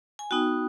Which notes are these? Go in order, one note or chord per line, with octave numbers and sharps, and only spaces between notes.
G#5
B3 D#4 F#4 G5